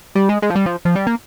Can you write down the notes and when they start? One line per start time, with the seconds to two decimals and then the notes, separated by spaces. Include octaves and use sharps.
0.15 G3
0.29 G#3
0.42 G#3
0.50 F3
0.56 G3
0.66 F3
0.85 F3
0.96 G3
1.07 A#3